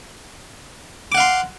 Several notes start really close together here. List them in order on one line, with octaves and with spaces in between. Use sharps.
D6 F#5 F5 C6